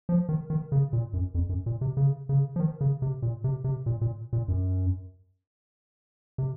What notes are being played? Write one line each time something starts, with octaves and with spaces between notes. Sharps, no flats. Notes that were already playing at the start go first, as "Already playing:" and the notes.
F3
D#3
D#3
C#3
A#2
F#2
F2
F#2
A#2
C3
C#3
C#3
F3
D#3
C#3
C3
A#2
C3
C3
A#2
A#2
A#2
F#2
C3